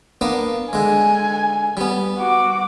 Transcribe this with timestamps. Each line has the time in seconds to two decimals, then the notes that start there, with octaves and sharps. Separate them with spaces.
0.21 A#3 B3 D4
0.73 D3 G#3 G#5
1.77 G3 B3
2.18 F#4 D6